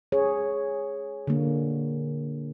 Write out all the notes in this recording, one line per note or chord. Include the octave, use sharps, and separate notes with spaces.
G#4 C#5
D3 A#3